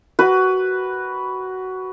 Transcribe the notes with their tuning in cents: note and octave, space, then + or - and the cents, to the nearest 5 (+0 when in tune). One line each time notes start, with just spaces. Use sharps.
F#4 +15 B4 +0